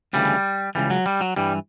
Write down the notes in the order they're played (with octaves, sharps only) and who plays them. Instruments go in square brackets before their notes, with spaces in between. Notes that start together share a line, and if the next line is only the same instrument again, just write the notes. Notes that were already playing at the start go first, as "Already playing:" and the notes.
[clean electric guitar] D2 C#3 E3 G3
C#2 C#3 E3 G3
F#3
G3
F#3
G2 E3 G3